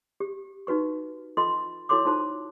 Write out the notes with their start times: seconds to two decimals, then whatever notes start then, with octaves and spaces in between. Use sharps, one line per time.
0.20 G4
0.67 D#4 F#4 B4 C#6
1.37 F4 A4 D#5 B5 C6
1.89 E4 F#4 A4 C#5 C6 D6
2.05 D#4 F4 A4 C5 A5 C6